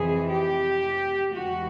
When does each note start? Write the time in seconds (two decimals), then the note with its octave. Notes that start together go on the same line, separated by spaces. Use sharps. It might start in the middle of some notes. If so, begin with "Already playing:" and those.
Already playing: F2 C3 E3 G#4
0.29 G4
1.32 E2 C#3 E3 G#3 F#4